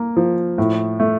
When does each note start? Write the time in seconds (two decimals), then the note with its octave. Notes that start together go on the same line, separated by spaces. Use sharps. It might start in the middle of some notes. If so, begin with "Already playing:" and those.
Already playing: A#3
0.17 F3
0.58 A2
1.00 A3